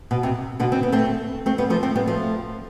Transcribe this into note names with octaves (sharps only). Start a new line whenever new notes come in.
B2
C3
B2 D3
C4
B3
A3 C4
A3 C4
G3 B3
F3 A3
A3 C4
G3 B3
F3 A3